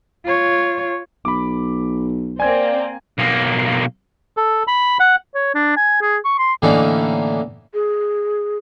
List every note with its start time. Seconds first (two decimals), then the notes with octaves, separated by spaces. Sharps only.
0.25 F4 C#5
1.25 B1 B5 D6
2.40 A#3 C4 D5 G#5 G#6
3.18 B1 A#3
4.37 A4
4.67 B5
5.00 F#5
5.35 C#5
5.54 D4
5.77 G#5
6.02 G#4
6.25 C#6
6.38 C6
6.62 A2 D3 E3 A#3 C#4 D#4
7.74 G#4